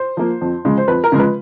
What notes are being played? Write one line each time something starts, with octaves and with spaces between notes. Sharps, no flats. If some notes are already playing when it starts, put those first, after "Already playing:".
Already playing: C5
F3 A#3
F2
C#3 F3 G#3
C5
F2 B4
A#4
C#3 F3 G#3
B4